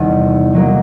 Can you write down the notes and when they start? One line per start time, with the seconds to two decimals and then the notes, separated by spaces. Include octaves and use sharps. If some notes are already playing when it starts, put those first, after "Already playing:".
Already playing: E2 C3 D#3 G3 B3
0.53 D#3 F#3 A#3